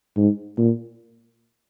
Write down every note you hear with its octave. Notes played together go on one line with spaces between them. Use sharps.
G#2
A#2